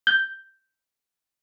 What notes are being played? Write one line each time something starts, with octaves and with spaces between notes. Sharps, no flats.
G6